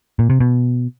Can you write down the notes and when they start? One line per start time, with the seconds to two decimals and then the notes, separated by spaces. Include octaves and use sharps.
0.19 A#2
0.30 C3
0.40 B2